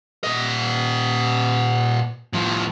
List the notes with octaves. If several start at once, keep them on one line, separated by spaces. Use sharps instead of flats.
A#2 D#5
A2 F3